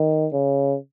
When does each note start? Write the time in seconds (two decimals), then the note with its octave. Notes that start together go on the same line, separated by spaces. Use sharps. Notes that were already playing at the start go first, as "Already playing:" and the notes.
Already playing: D#3
0.33 C#3